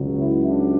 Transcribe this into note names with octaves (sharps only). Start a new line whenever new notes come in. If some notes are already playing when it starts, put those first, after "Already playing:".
Already playing: C#2 C#3 F#3
E4
D4